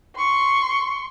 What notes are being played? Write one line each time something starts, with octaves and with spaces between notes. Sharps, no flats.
C6 C#6